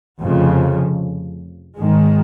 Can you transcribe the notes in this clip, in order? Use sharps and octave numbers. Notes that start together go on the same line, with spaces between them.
F1 F2 C#3 F3
G#1 G#2 D#3 G#3